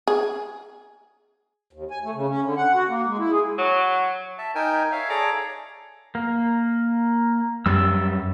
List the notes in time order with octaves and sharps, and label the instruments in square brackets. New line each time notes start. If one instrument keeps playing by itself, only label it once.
[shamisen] G#4
[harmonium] D#2
G#5
A3
C#3
C#4
D3
F#5
F#4
A#3
G#3
E4
G#4
[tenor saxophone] F#3
[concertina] E5 A5
D#4 A#4 G5 G#5
C#5 E5 F5
G#4 A4 C#5 D5 A#5 D6
[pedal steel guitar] A#3
[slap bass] F#2 G3 [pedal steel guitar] E6